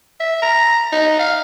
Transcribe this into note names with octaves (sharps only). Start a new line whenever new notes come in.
E5
A#5
D#4
F5